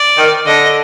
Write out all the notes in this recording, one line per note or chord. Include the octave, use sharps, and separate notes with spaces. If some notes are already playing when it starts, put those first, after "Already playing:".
Already playing: D5
D#3
D3 D#5